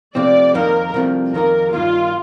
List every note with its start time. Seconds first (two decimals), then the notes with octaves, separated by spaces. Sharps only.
0.15 C3 F3 A3 C4 D5
0.55 F2 D#3 A#3 A#4
0.94 C2 C3 F3 A3
1.34 F2 D#3 A#3 A#4
1.73 G2 D#3 A#3 F4